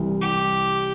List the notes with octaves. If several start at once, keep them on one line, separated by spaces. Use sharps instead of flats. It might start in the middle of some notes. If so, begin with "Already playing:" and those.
Already playing: C2 C3 E3 G3
G4